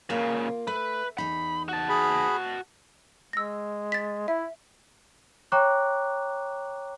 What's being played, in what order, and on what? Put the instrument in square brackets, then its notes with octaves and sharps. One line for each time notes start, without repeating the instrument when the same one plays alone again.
[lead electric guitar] A#2 C#3 [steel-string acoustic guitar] A#3 F4
[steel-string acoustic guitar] A3 [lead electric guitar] B4
[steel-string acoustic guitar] E2 D#4 [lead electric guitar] B5
[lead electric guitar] F#4 A5
[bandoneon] G#4 B5
[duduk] G#3 [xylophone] E6 A#6
[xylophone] A6 B6
[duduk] E4 [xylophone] E5
[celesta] C#5 G5 A#5 C#6 D6 F#6